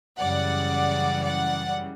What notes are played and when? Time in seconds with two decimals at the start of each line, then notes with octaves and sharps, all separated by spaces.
0.20 F#2 C#3 E3 G3 D5 F#5
1.24 D5 F#5